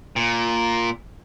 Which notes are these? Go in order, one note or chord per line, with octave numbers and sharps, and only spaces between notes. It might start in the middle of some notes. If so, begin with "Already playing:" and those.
A#2